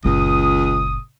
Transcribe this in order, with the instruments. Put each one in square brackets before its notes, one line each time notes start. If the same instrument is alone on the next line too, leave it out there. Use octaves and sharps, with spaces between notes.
[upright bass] F#1 A#2 [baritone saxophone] C#2 [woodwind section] D#6